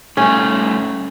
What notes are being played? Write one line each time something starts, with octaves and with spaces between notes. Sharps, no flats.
G2 A3 C#4